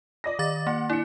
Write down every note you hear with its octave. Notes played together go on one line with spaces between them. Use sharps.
D5 D#5 A#6
D#3 D6 A6
A#3 F#5
D4 E4 C#7